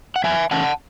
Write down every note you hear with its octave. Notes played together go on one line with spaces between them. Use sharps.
F#5
F#2 E5 G#5
E3 A3 C#4 F#5 A5